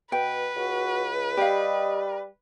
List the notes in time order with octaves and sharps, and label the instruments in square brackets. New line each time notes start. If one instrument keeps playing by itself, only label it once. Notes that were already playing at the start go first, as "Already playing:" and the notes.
[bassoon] B2 [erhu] B4 [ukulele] G5
[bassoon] C#2 [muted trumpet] F#4
[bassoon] G3 [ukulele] G4 F5 [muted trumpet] D#5